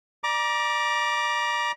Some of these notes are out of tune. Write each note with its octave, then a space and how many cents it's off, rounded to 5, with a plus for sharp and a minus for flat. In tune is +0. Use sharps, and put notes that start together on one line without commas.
D5 +25 A#5 +35 D6 +0